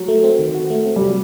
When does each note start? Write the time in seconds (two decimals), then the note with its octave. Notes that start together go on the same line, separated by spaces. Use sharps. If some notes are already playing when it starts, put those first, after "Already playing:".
Already playing: F#3
0.08 A3
0.24 C4
0.39 D#3
0.54 F#4
0.70 A3
0.86 C4
0.96 G3
1.01 C3 F#3